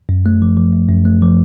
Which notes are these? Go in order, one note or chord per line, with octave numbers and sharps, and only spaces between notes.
F#2
A3
F3
F3
F#2
F#2
A3
F3